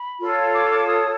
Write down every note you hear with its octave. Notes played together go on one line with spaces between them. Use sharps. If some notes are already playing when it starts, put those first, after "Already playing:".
Already playing: B5
F4 A4 C#5
D6
D6
D#6